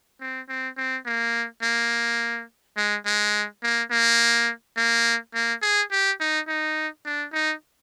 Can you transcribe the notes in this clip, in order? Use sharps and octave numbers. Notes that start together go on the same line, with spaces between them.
C4
C4
C4
A#3
A#3
G#3
G#3
A#3
A#3
A#3
A#3
G#4
G4
D#4
D#4
D4
D#4